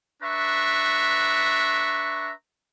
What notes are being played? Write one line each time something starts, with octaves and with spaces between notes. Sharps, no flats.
D4 B4 E5 A#5 C#6